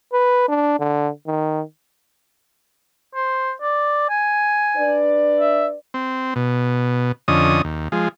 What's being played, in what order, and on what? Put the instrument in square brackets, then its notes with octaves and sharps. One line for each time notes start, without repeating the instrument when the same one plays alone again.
[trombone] B4
D4
D3
D#3
[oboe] C5
D5
G#5
[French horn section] D4 B4 D5
[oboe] E5
[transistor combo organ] C4
B2
F2 D3 C#4 D#5 D#6
D#2
F3 G#3